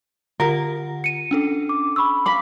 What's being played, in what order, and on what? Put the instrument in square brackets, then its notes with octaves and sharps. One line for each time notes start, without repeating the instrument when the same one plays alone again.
[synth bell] D3 F4 F#5 [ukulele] A#4
[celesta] C#7 D#7
[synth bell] C#4 D4 A4
[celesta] D6
B5 C#6 E6
[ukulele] F5 B5 [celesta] D6 B6